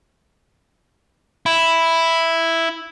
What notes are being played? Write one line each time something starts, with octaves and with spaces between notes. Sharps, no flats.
E4